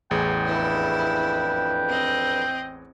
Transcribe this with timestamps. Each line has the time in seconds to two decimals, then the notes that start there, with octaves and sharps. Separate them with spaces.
0.11 A1 E2 G#4 G5
0.46 F2 D4 E4 B4
1.88 C4 D#5